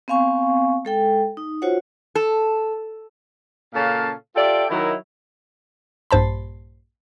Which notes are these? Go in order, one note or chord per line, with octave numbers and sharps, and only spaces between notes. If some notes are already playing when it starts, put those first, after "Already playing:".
B3 C4 F5 G#5 C#6
G#3 A4 G5
D#4
F4 F#4 C5 C#5 F#5
A4
A#2 C#3 C#4 A4 F5 A5
F4 G4 A4 D5 E5 G5
D#3 F#3 E4
A#1 G2 C5 A5 B5